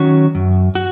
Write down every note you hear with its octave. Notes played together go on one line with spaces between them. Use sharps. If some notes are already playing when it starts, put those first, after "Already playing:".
Already playing: D#3 F#3 C#4 F#4
F#2
F#4